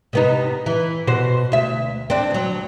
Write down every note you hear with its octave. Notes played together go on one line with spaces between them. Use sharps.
C3 B3 D#4
E3
B2 F#4 C5
D2 E5
C4 D4
D2 F#3